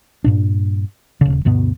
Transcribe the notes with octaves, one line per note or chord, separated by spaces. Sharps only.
G2 A#2 D4
D#1 C#3
D2 G2 B2 B3